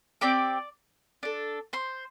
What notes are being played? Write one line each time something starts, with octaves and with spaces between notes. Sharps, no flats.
C4 G4 D5 D6
D4 A4
C5 C6